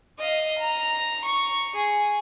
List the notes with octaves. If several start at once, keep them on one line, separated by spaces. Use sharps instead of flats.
D#5 F5
A#5
C#6
G#4